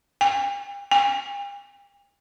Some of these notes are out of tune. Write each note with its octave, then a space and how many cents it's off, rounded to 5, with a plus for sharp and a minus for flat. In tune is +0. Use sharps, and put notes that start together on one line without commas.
G5 +40
G5 +45